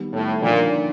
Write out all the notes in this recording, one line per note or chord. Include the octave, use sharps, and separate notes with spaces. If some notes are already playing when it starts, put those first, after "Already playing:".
Already playing: D#3 G3 B3
A2
A#2 D3 F3 A#3 D#4